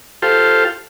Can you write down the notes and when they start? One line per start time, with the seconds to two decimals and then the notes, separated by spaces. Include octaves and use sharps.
0.22 F4 G4 A4 C5